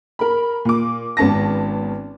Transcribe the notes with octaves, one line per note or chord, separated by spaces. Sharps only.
A#4 B5
A#2 D6
G#1 B3 C#4 A5 A#6